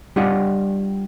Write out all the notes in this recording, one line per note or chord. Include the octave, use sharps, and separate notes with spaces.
G3 D4 F4 G4 D#5 F#5